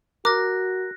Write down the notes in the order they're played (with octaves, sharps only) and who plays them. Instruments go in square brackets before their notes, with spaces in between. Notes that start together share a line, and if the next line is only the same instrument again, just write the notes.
[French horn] F#4 [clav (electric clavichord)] A#4 [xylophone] D6 [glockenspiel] F#6 A#6